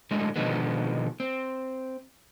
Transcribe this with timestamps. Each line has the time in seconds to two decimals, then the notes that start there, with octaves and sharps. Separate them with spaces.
0.11 A2 D3 F#3 G#3
0.36 B2 D3 D#3 F3 G#3 B3
1.20 C4